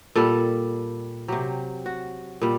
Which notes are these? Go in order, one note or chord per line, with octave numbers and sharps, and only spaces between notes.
A#2 G3 A4
C3 F#3 G4
F#4
A#2 G3